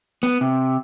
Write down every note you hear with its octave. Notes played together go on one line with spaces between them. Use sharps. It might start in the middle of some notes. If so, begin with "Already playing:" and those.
B3
C3